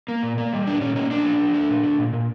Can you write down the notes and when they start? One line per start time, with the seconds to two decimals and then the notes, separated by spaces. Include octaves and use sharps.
0.08 A#3
0.23 A#2
0.38 A#3
0.53 G3
0.67 A#2 D4
0.81 A#2 C#4
0.96 A#3 C#4
1.11 A#3 D4
1.25 F3
1.39 F3
1.54 A3
1.70 A#2
1.83 A3
1.99 A#2
2.13 A#2